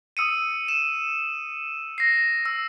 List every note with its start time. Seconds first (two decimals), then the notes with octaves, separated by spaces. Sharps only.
0.17 D#6 E6 C#7 D#7
0.68 E7
1.98 A#6 C7
2.46 E6